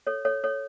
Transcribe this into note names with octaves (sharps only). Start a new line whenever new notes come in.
A4 C#5
A4 C#5
A4 C#5